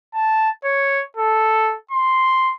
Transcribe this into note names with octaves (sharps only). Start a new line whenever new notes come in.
A5
C#5
A4
C6